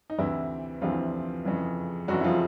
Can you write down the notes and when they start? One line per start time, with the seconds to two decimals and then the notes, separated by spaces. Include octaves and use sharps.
0.10 D#4
0.18 D2 C3 E3 E4
0.82 D2 C3 E3 F3 F4
1.45 F2 C#3 E3
2.08 F2 C#3 E3 F#3 F#4
2.20 E4
2.24 F3 F4